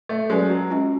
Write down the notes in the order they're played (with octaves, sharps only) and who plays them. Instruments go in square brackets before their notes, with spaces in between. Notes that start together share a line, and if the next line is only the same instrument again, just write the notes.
[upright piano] A3
[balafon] F#3 C#4 F#4 B4 D5 [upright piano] G#3
[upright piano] F#3
[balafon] G#3 C#4 F4